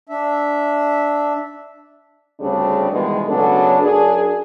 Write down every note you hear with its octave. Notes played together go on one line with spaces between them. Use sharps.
D4 E5
D2 C#3 G3 C4 D4 G#4
B2 D#3 E3 G3 G#3 B3
C#3 F#3 A3 B3 D4 A4
F#2 D4 F#4 G#4